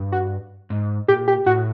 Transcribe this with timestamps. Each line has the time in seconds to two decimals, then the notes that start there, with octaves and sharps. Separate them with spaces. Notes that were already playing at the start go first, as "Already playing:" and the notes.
Already playing: G2
0.12 F#4
0.70 G#2
1.08 A#2 G4
1.28 G4
1.46 A2 F#4